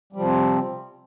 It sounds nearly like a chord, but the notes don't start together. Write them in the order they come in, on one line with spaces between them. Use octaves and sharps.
G3 F3 C3 C4